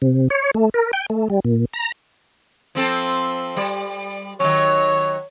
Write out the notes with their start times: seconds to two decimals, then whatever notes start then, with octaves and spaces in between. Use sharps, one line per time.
0.02 C3
0.30 C#5
0.55 A3
0.74 A#4
0.93 G5
1.10 A3
1.30 G3
1.45 A#2
1.73 A#5
2.75 F3 C4 A4
3.57 G3 D5
4.40 D#3 F#3 C#5